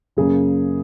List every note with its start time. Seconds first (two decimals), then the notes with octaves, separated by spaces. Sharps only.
0.17 F#2 C#3 A#3 G#4